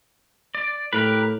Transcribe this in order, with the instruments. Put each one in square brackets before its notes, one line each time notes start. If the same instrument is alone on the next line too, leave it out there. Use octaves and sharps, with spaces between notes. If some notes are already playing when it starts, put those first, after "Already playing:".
[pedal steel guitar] D5
[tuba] A2 [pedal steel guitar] G4 A#4 B4